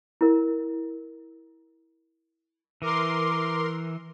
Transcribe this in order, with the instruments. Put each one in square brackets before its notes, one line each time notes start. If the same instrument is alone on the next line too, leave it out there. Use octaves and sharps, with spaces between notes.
[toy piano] E4 A#4
[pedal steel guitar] E3 [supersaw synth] A#4 C6 [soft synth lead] D6